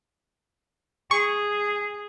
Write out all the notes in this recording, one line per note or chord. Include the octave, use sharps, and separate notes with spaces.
G#4 C#6